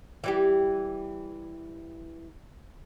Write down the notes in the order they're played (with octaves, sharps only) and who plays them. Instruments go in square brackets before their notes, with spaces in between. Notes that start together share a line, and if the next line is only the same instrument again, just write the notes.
[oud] E3 G3 G4